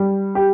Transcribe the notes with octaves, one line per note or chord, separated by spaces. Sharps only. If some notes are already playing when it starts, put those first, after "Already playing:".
Already playing: G3
G4